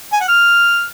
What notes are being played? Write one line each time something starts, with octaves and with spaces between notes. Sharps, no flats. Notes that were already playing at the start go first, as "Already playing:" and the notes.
G#5
F#5
F6